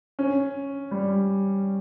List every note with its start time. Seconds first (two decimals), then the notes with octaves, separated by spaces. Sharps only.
0.19 C#4
0.91 G3